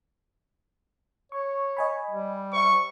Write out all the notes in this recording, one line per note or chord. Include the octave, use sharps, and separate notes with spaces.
C#5 C#6
D#5 G#5 B5
G3
C5 E5 C#6